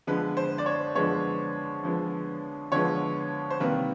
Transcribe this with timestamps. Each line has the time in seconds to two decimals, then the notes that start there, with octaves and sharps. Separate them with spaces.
0.07 D3 F3 G#3 B3 B4
0.37 C5
0.58 D5
0.66 C#5
0.95 D3 F3 G#3 B3 C#5
1.83 D3 F3 G#3 B3
2.72 D3 F3 G#3 B3 C#5
3.50 C5
3.60 C3 D#3 G3 A#3 B4